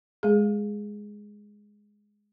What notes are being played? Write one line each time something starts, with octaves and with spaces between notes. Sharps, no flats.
G#3 G#4